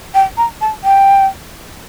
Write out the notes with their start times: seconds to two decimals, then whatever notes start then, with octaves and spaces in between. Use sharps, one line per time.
0.15 G5
0.37 A#5
0.61 A5
0.84 G5